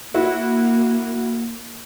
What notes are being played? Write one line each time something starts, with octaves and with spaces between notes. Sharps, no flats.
A#3 E4 F#4